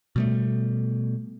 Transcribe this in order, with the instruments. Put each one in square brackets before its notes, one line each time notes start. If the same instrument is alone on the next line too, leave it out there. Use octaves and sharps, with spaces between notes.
[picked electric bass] B2 G3 A3